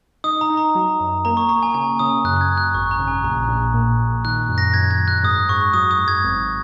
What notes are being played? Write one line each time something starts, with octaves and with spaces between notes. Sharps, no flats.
D#4 D#6
A#5
D#4
A#5
F#3
F#2
A#3 A#5
C#6
A#3 A#5
G#5
C#3 G#5
C#3 D#6
F#2 F#6
F#6
G#6
F#2
F#6
G#1 C#6
A#5
C#3
G#5
A#1 A#5
A#1
A#2
A#2
D#3 F#6
F#2
A#6
F#2 G#6
G#6
F#2
F#6
G#2 D#6
G#2 C#6
F#3 D#6
D#6
G#2
G#6
G#1